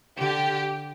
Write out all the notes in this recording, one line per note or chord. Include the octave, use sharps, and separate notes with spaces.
D3 G4